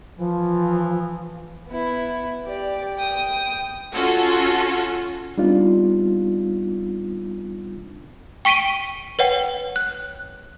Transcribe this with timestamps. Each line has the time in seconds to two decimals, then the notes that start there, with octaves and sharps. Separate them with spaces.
0.17 E3 F3
1.68 B3 E4
2.45 G4 D5
2.97 G5 D#6
3.93 C#4 F4 F#4 A4
5.38 G3 B3 C4 D4 D#4 F4
8.45 G5 C#6 B6 D7 D#7 G7
9.19 B4 C#5 F#5 G5
9.76 F#6